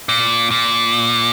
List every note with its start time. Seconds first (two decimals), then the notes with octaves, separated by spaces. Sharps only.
0.09 A#2
0.51 A#2